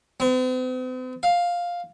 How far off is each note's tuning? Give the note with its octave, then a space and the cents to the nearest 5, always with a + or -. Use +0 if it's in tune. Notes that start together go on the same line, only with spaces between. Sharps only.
C4 -45
F5 +5